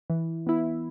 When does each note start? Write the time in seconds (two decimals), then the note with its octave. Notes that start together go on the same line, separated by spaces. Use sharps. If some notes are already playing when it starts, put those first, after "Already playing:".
0.10 E3
0.47 B3 E4